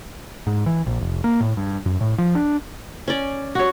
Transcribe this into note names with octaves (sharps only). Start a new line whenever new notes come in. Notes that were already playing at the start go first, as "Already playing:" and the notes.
G#2
E3
A#1
F1
A#3
A2
G2
F#2
A2
F3
D4
C#4 D5
F#4 C#5